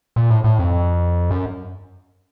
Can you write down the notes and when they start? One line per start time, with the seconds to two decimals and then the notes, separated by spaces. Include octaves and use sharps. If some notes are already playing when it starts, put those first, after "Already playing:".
0.16 A#2
0.30 A2
0.44 A2
0.59 F2
1.30 F#2